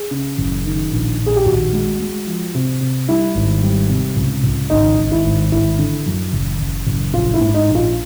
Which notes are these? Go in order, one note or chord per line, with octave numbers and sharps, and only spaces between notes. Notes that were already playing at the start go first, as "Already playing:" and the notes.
Already playing: G#4
C#3
F#1
D#3
A#1
A#1
G#4
G4
D#2 F#4
G#3
G#3
F3
C3
C3
G3 E4
G#1
G3
C3
C#2
C#2
G#1 D#4
G#1
E4
G#1
G#1 E4
D3
F#2
F#1
F#1
F#1
A#1 F4
E4
G#2
D#4
A#1
F4